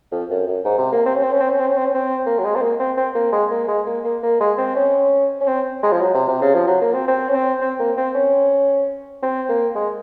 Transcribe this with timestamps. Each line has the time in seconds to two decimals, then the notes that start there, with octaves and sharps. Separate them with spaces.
0.12 F2
0.30 F#2
0.47 F#2
0.65 G#2
0.78 C3
0.92 A#3
1.06 C4
1.15 C#4
1.23 C4
1.32 C#4
1.41 C4
1.50 C#4
1.59 C4
1.67 C#4
1.77 C4
1.86 C#4
1.94 C4
2.26 A#3
2.38 F#3
2.44 G#3
2.56 C4
2.62 A#3
2.79 C4
2.97 C4
3.15 A#3
3.33 G#3
3.51 A#3
3.68 G#3
3.87 A#3
4.04 A#3
4.23 A#3
4.40 G#3
4.58 C4
4.76 C#4
5.41 C#4
5.48 C4
5.83 G#3
5.92 F3
6.02 F#3
6.14 C3
6.28 C3
6.42 C#3
6.55 F3
6.67 F#3
6.82 A#3
6.94 C4
7.08 C4
7.29 C#4
7.35 C4
7.61 C4
7.79 A#3
7.97 C4
8.15 C#4
9.23 C4
9.49 A#3
9.75 G#3